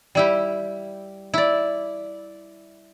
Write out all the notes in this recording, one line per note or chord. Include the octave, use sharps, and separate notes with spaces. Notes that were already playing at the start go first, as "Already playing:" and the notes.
G3 E4 G4
E4 D5